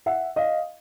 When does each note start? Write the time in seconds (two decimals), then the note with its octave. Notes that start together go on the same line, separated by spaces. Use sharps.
0.06 E5 F#5
0.36 D#5 F5